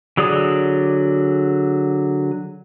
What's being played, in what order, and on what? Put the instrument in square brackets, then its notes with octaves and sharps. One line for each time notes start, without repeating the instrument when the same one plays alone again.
[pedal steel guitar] D3 F#3 G#4 D5 D#6